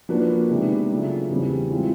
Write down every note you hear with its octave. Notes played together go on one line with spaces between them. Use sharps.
F3 A#3 D4 F#4 B4
C3 D#3 G#3 B3 D4
C#3 F#3 A3 D4 F4
E2 C#3 E3 G3 C4
E3 G#3 C4 F4